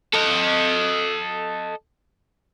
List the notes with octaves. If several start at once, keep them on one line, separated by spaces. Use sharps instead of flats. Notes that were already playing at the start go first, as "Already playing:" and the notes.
A4 D#5